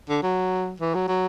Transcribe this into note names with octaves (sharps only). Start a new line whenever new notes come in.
D3
F#3
E3
F#3
F#3